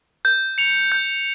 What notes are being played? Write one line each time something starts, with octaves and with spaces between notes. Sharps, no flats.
G6
C#7 F7
G6